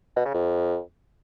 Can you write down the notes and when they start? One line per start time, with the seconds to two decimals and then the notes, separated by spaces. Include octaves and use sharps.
0.17 B2
0.26 C#3
0.34 F2